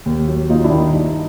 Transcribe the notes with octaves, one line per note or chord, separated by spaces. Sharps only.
D#2
F#3
D#2 D#4 F4
D4 E4
D#3
D#4
G2 D#4